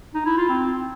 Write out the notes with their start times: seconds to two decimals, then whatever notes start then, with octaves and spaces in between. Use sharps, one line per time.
0.14 D#4
0.26 E4
0.37 F4
0.49 C4